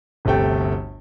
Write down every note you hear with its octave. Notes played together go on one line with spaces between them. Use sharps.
G1 D2 C3 A3 G5